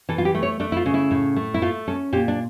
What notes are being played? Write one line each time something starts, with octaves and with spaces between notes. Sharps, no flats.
E3 A4
F4
G4
A3
C#5
A3 D4
E4
F4
C#3
E4
A2
A3
E4
A3 F4
C#4 A4
A#2 G4
D4